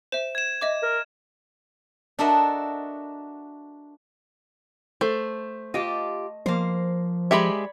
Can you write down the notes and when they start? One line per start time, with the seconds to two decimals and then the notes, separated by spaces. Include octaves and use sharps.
0.12 C5 E5 E7
0.35 G#6 E7
0.61 D#5 E5 D6
0.83 A#4
2.19 D4 F#4 A4 A#4 D#5 E5
5.01 A3 C5
5.74 F4 G4 D#5 A5
6.46 F3 A#3 C5
7.31 G#3 G4 C#5 D5 E5 B5